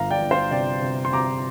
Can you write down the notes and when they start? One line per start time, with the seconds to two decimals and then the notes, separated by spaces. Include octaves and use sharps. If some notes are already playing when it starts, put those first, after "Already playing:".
Already playing: G1 F5 A#5
0.11 D5 G5
0.21 G1
0.31 C5 F5
0.51 C3 D5 G5
0.82 C3
1.05 C6
1.13 C3 A#5 D6